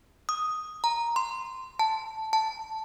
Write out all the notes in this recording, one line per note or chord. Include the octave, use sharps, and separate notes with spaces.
D#6
A#5
C6
A5
A5